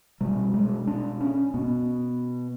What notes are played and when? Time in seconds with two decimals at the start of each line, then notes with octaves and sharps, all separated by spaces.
0.21 B2 G3
0.54 G#3
0.87 D4
1.21 C#4
1.54 B2 B3